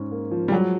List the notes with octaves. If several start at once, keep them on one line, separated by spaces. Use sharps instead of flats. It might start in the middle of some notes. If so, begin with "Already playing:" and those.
Already playing: G#2 C#4
A#3
F3
G3
F#3 G#3